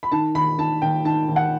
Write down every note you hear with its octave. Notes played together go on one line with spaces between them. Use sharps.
B5
D#3 A5
D#2 B5
D#3 A5
D#2 G5
D#3 A5
D#2
F#5